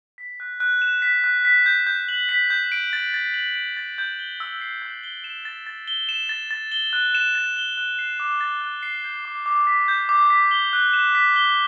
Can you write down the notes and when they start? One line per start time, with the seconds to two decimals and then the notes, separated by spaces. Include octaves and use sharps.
0.18 B6
0.40 F#6
0.60 F#6
0.82 E7
1.02 B6
1.24 F#6
1.45 B6
1.66 G6
1.87 G6
2.08 F#7
2.29 B6
2.50 G6
2.72 D7
2.93 A6
3.14 A6
3.34 F#7
3.55 D7
3.77 A6
3.98 G6
4.19 G7
4.40 E6
4.61 C7
4.82 G6
5.04 G7
5.24 E7
5.45 A6
5.67 A6
5.87 G7
6.09 E7
6.29 A6
6.51 A6
6.72 G7
6.93 F#6
7.15 E7
7.35 A6
7.56 G7
7.77 F#6
7.99 C7
8.20 D6
8.41 A6
8.62 F#6
8.83 C7
9.04 G6
9.25 D6
9.46 D6
9.67 B6
9.88 G6
10.09 D6
10.30 B6
10.51 G7
10.73 F#6
10.93 E7
11.15 B6
11.36 G7